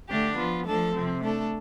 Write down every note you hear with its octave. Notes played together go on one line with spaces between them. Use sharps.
D3 A3 D4 G4
F3 B3 F4
F3 A3 D4 A4
C3 F3 C4
A3 D4 A4